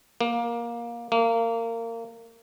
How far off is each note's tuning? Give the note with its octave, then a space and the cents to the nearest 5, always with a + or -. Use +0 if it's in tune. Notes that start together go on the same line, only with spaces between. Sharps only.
A#3 +15
A#3 -25